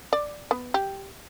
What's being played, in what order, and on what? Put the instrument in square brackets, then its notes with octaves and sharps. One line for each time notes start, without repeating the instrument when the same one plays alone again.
[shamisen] D5
B3
G4